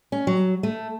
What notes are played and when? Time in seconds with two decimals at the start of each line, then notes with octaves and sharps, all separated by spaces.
0.12 C#4
0.27 F#3
0.63 A3